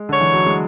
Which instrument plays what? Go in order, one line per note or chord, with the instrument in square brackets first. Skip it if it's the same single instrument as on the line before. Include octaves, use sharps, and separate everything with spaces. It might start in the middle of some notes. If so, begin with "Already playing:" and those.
Already playing: [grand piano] G#3
[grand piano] D3 [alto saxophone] C#5
[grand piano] E3
F#3
G#3